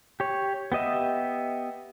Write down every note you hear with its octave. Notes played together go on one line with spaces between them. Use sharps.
G4 C#5
B3 G4 D#5 E5